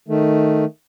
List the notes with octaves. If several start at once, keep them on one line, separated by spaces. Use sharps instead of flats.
D#3 A3